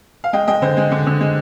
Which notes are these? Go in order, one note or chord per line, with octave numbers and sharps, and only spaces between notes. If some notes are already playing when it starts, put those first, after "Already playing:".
F5
G#3 D#5 G5
G#3 D#5 G5
D3 C5
G#3
D3
D3
G#3